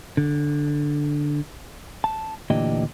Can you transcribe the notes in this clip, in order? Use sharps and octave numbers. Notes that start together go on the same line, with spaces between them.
D3
A5
D2 A#2 E3 D4 G4 D#5